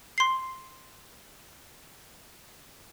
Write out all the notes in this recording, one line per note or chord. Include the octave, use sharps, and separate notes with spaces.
C6 C7